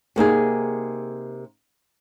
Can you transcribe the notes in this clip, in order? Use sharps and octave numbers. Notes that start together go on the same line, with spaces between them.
C3 A#3 D#4 G#4